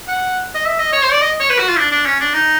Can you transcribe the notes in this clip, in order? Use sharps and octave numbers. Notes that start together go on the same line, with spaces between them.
F#5
D#5
E5
D#5
C#5
C5
D5
D#5
C#5
B4
F#4
F4
D4
D4
C#4
D4
D#4